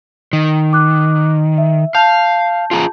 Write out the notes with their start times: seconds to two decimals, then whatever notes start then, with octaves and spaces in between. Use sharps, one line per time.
0.33 D#3
0.73 D6 F#6
1.58 E5
1.95 F5 A5 G6
2.71 F4 G#4 A#5